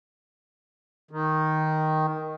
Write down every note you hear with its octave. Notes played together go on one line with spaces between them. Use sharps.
D#3